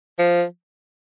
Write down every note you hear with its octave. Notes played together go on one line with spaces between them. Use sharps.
F3